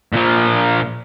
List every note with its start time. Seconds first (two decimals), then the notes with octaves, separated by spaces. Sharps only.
0.13 A#2 F3